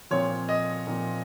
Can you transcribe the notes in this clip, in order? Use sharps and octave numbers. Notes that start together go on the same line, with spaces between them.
A#2 F3 C4 C#5
D#5
A#2 F3 C4